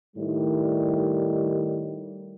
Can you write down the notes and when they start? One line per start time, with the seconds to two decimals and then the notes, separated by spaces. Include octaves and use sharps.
0.16 A2 D#3 G3